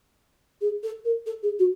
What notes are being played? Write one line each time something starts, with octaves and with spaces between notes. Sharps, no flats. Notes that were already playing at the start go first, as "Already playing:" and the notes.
G#4
A4
A#4
A4
G#4
F#4